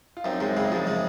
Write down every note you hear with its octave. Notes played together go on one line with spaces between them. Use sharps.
F4
F#2 C4 D#4
F#2 G#3 C4
C#3 G#3 C4
F#2 F3 G#3
C#3